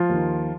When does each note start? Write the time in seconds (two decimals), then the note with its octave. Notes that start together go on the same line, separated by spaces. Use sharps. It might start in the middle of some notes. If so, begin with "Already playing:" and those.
Already playing: F3 F4
0.09 D#2 D#3